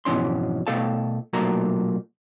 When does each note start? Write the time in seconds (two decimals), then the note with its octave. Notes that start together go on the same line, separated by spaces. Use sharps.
0.05 F2 G#2 B2 E3 C#4 C6
0.67 B2 A3 A4 F5 A5
1.33 B1 A#2 F#3 A3 A#3 A#5